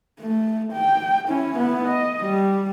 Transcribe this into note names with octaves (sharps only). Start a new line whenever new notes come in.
A3
G5
C#4 E4
B3 E4
D#5
G3